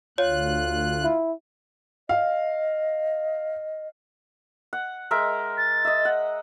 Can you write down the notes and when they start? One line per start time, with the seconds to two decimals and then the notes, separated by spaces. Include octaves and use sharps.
0.18 D2 F4 C#5 F#6
1.03 E4
2.09 D#5 F5
4.73 F#5
5.11 G#3 A#4 E5
5.58 A6
5.85 D#5 E5
6.05 F#5